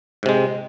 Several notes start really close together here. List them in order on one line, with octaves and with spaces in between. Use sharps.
G#2 C3 G#3